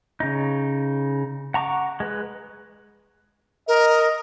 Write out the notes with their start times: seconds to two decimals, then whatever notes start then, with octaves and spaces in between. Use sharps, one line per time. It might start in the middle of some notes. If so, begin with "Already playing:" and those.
0.20 C#3 D#4
1.54 F#5 A#5 C#6 D6
2.00 G#3 B4
3.68 A#4 D#5